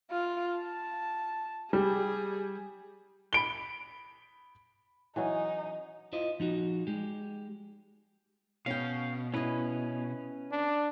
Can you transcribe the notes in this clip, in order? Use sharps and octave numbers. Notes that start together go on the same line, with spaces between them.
F4
A5
G3 G#4
B5 D7 G7
E3 F#3 C#4 D#4
E4 F4 C5 D#5
F3 D#4 F#4
G#3 G4
B2 C#4 F5 G5
C#4 E4 B4 D#5
D4